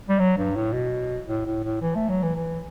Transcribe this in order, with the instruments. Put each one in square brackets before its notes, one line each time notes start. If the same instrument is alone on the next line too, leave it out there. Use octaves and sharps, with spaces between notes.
[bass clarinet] G3
F#3
G2
A2
B2
A2
A2
A2
E3
A3
F#3
E3
E3